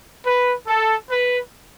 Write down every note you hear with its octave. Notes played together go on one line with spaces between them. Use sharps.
B4
A4
B4